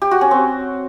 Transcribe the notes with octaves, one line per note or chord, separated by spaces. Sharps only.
G4
F#4
C#4
C4